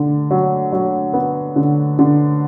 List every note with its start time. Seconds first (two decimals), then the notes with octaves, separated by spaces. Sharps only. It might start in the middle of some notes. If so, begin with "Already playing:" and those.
Already playing: D3
0.31 F#3
0.73 F#3
1.13 B3
1.56 D3
1.99 D3